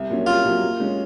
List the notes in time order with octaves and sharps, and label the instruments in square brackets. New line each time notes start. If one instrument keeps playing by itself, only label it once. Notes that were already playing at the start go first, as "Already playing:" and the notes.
Already playing: [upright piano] C2
A#2 F#3 C#4
[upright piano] C2 [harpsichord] F4
[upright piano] A#2 F#3 C#4
A#2
G#3 C#4